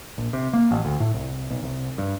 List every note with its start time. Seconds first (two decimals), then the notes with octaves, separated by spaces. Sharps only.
0.18 A#1
0.33 C3
0.53 A#3
0.71 A1
0.85 D2
1.00 A2
1.14 C2
1.50 B1
1.63 C2
1.98 G2